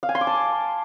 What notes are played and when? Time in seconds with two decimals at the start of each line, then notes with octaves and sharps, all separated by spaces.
0.03 F5
0.09 G#5
0.15 C6
0.21 D6
0.27 A5